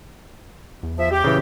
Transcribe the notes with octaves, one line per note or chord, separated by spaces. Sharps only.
E2
F3 E5
G4
A#2 C#3 E3